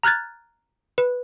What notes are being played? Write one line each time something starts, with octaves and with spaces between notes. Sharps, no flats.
A#5 F6 F#6 G#6 A6
B4